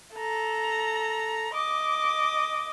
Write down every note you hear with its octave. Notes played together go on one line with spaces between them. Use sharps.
A4 A#5
D#5 D6